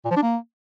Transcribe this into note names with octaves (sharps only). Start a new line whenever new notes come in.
A#2
F3
D4
A#3